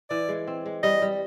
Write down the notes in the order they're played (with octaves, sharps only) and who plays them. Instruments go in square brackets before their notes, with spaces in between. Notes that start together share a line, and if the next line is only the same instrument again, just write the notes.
[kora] E3 [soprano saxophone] D5
[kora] G#3
C4
G#3
[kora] G3 [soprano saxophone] D#5
[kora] G3